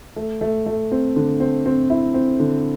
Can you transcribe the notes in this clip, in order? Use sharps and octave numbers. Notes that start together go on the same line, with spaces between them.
A3
A3
A3
C4
D3
C4
C4
E4
C4
D3